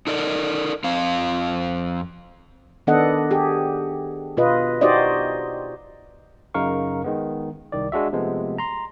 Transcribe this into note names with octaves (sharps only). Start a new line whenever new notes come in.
D#4 A4 A#4 D5 D#5
F2 C4 F5
D#3 B3 D4 A4 D#5 F#5
G4 G#4
B2 F4 B4 D#5
D#4 F#4 G4 C5 D5 D#5
F#2 C#3 D#4 A#4 F5 C#6
D#3 G#3 B3
C2 D#3 D5
G#3 D4 F#4 E5
C3 F3 G#3 A3 B3
A#5 C6